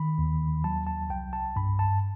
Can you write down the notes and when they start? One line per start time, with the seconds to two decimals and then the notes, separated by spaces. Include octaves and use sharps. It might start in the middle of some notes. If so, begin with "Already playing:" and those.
Already playing: D#3 B5
0.18 D#2
0.64 F#3 A5
0.87 A5
1.10 C2 G5
1.33 A5
1.56 G2 B5
1.79 A5